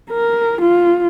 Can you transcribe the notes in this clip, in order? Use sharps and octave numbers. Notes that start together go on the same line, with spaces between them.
A#4
F4